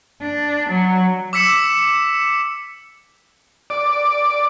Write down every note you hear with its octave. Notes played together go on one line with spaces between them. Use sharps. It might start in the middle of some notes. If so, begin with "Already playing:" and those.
D4
F#3
D6 E6 B6 C#7 E7
D5